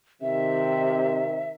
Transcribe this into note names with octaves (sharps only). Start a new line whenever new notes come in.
C3 D#3 E5